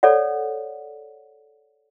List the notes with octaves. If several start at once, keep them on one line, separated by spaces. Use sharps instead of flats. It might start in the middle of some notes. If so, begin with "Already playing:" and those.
A4 C#5 D5 F#5